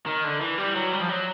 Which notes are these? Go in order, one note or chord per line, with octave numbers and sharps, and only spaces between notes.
D#3
D3
E3
G3
F#3
G3
F3
F#3